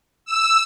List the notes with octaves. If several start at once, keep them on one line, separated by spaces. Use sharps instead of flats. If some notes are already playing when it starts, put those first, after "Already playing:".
E6